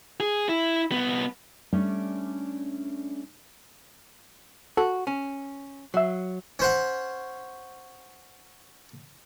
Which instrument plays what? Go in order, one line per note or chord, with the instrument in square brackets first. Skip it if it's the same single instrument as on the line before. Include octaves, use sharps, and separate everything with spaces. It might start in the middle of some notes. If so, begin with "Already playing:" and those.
[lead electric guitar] G#4
E4
C2 B3
[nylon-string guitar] G3 A3 C#4 D4 D5
[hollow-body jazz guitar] F#4 [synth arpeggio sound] A4
[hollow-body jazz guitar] C#4
[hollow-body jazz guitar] F#3 [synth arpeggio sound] E5 C7
[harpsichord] C#4 C5 F#5